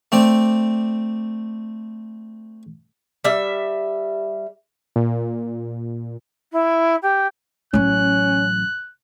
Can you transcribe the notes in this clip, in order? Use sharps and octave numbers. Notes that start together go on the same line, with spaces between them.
A3 C4 D5
G3 E5
A#2
E4
G4
A1 F#3 C#4 F#6